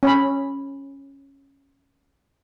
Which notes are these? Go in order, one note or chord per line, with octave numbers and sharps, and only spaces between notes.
C#4 B5